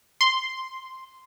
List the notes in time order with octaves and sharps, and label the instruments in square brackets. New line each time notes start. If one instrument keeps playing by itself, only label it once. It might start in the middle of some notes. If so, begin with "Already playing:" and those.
[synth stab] C6